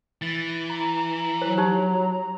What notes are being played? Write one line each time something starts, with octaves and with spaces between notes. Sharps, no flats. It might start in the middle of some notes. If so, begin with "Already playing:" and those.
E3 A6
A#5
F#3 C5
D#4 G4 C5